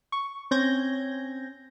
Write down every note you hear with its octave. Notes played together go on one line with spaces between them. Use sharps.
C#6
C4 C#4 G6 G#6 A#6